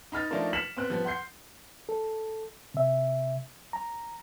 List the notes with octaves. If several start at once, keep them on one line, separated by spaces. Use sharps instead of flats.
D#4 B5 F6 A6
F3 A3 D4 D#4 F4 A#4
F6 B6 C#7 E7 F#7
B3 C4 F#6
F3 G3 B3
F#5 C6 G6 C7
A4
C3 E5
A#5